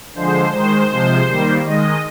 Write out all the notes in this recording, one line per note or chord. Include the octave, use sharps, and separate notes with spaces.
D3 F3 G#3 C5
D#3 G#3 C5
C3 F3 G#3
D#3 G3 A#3
D#3 G#3 D#5